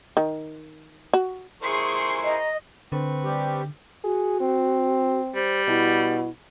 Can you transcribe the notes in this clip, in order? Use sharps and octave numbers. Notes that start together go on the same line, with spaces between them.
D#3
F#4
E4 G#4 A#4 C5 C6 C#6 C7
D#5 A#5
D3 C4 B4 C#6
G3 G4
F#4 G#4
C4
G3 C5
B2 E4